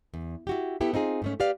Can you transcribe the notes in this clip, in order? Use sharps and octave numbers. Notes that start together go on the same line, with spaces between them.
E2
E4 F#4 G4
B3 E4 G4 A4
C4 D#4 F4 G#4
G#2 A3 C#4
G4 B4 D5 F5